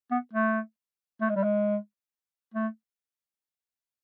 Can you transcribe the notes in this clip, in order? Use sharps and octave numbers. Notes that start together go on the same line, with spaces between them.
B3
A3
A3
G#3
G3
G#3
A3